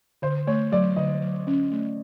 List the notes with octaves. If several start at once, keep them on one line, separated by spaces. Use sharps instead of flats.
D3 C5
A3 C#5
F#3 D5
D3 D#5
F#3
C#4
A3